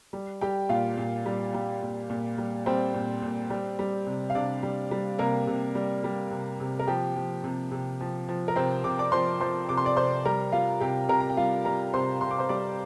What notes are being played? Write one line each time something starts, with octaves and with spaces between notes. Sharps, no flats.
G3
G3 G4 G5
A#2 F4 F5
A#2
G3
G3
A#2
A#2
G3
G3 C4 C5
A#2
A#2
G3
G3
C3
F5
C3 D4 D5
G3
G3
C3 A#3 A#4
C3
G3
G3
C3
C3
A#4
F3 G4
F3
C3
C3
F3
F3
A#4
C3 C4 C5
C3 D6
D5 D6
F3 C5 C6
F3 C5 C6
C3 D6
C6
D5 D6
C3 C5 C6
G3 A#4 A#5
G3 F4 F5
C3 G4 G5
C3 A#4 A#5
A#5
G5
G3 F4 F5
G3 A#4 A#5
C3 C5 C6
C3 C6
D6
C5 C6
G3 D5 D6